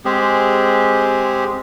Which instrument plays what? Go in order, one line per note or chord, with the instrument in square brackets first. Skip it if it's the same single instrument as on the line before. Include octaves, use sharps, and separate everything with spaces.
[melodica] G#3 C4 G4 G#4